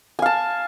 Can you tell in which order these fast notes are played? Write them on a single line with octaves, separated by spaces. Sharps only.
G#5 F5 A5